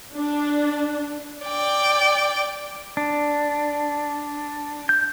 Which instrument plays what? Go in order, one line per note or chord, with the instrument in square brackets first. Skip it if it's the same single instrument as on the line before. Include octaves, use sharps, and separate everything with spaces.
[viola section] D4
[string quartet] D5 G5
[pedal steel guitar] D4
G6